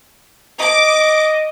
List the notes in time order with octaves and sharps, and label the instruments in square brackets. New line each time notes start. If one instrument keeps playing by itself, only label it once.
[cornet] D#5 [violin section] D6